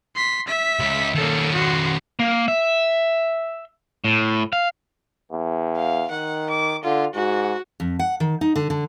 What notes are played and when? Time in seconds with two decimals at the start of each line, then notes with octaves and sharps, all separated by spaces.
0.15 C6 B6
0.47 E5 B6
0.79 C#2
1.15 D#3 A#3 C#4 A4
1.53 F#4 C6
2.19 A#3
2.48 E5
4.04 A2
4.53 F5
5.32 E2
5.77 F5
6.12 D#3 F#5
6.50 D6
6.84 D3 F4
7.15 G#2 F#4
7.80 F2
7.99 F#5
8.20 D#3
8.41 D#4
8.56 D3
8.70 D3